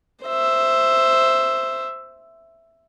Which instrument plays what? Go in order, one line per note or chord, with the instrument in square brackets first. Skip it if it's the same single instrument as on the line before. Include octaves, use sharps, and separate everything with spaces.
[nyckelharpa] C5 E5